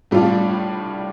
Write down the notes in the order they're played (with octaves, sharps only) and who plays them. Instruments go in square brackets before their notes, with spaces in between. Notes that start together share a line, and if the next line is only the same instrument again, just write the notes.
[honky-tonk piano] A2 G3 D4 F4